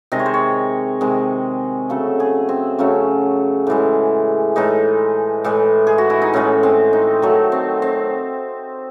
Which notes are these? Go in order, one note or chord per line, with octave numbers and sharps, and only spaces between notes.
C3 D#3 G#3 D#5
C#5
C5
C#5
C3 D#3 G#3
C#3 F#3 A3 A4
G#4
C4
C#3 F#3 A3 C#4
A2 E3 G#3
A2 E3 G#3 D#4
A2 E3 G#3
G#4
F#4
E4
D#4
A2 E3 G#3 C#4
C4
D#4
D#3 F#3 A3
C4
C4